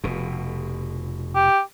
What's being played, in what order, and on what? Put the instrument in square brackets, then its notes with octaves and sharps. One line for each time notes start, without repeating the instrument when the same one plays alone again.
[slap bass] F1 B2
[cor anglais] G4